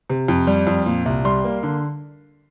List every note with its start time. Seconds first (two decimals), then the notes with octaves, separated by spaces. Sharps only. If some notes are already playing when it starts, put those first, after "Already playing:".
0.10 C3
0.28 F2
0.47 G3
0.67 F2
0.86 A#2
1.06 C2
1.25 G3 C6
1.44 A#3
1.63 D3